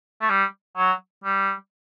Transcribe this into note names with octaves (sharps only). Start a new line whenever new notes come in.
A3
G3
F#3
G3